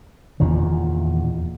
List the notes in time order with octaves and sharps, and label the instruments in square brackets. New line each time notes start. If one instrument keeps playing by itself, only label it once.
[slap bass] E2 A#2 D#3